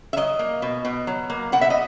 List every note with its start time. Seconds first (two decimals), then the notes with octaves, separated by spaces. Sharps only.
0.13 E5
0.17 F#3 D#5
0.39 A#3
0.62 B2
0.85 B2
1.07 F#3
1.30 A#3
1.52 B2 F#5
1.61 E5
1.70 D#5